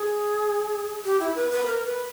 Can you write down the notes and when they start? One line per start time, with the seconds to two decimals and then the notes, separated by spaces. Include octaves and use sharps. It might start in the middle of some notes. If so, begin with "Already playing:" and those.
Already playing: G#4
1.05 G4
1.20 E4
1.35 B4
1.50 B4
1.66 A#4
1.85 B4